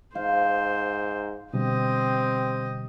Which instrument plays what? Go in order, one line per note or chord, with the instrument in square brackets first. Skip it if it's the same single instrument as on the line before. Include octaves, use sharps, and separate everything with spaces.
[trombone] G#2 [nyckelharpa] C5 [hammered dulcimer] F5
[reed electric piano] B2 D3 G3 [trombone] C4 [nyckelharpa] G4 D#5